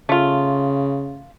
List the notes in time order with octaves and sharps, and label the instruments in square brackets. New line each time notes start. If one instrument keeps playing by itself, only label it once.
[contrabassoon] C#3 [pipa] A3 F4